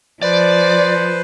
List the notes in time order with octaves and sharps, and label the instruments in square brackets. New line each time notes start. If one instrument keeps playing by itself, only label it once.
[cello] F3 [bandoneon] B4 C5 [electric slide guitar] D5